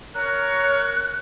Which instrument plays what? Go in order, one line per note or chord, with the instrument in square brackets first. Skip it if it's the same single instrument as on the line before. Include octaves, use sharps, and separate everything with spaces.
[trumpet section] A#4 C#5 [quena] F#6